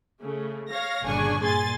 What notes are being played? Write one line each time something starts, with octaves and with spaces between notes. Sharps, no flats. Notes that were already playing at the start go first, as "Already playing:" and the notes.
C#3 A3
C#5 F5 A#6
G1 A#2 C#3 D4 G#5 C#6
G2 A#2 G#4 G#5 C6 A6